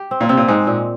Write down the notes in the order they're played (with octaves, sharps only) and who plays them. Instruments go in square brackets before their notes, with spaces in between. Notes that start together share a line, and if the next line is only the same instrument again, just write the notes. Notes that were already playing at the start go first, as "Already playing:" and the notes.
Already playing: [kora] G4
C4
[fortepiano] A#2
[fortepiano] C3 [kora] C4
[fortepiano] A#2
[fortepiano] G#2 [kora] G#3
[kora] A#2